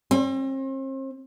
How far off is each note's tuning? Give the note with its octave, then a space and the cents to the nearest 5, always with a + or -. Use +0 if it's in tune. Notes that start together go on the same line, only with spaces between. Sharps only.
C4 +40